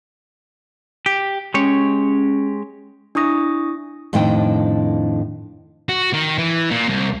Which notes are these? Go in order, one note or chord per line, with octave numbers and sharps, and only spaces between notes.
G4
G#3 C#4 G4 C#5
D4 E4 C#6 D#6 A#6
F2 A2 D#3 D4 D#5 G5
F#4
D#3
E3
A#2
C2